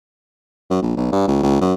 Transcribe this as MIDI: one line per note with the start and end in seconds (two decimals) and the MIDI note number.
0.70 0.77 42
0.82 0.92 34
0.97 1.11 35
1.12 1.23 43
1.27 1.42 37
1.43 1.58 37
1.61 1.74 42